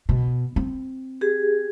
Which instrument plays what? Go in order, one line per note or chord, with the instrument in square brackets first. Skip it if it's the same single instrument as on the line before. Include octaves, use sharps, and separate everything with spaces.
[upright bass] B2
C4
[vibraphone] G4 G#4